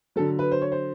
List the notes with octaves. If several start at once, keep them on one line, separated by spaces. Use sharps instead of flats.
D3 F#3 A4
B4
C5
C#5
C5